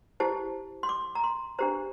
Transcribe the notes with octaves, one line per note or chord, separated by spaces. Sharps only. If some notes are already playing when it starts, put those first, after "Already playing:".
E4 G4 C5 A5
C6
D6
A#5
C6
D4 G4 C5 A#5